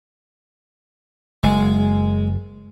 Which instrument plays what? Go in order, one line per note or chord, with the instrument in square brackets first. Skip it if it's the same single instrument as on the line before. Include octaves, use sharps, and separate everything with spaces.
[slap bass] F#1 [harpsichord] G#3